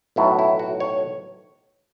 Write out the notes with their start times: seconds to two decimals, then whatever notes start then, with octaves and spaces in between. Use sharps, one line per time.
0.16 B1 A2 F#3 E4
0.39 E4
0.59 F#4
0.80 C#5